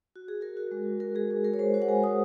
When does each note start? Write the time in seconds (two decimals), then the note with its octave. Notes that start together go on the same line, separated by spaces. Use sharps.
0.16 F#4
0.28 G#4
0.41 F#4 A#4
0.57 F#4
0.71 G#3
0.86 F#4
1.00 F#4 A#4
1.15 G#3 G#4
1.30 G#3
1.44 G#3 A#4
1.54 C#5
1.59 G#3 C5
1.74 F#4 C5
1.82 F#5
1.88 G#3 G#5
2.04 G#3 D#6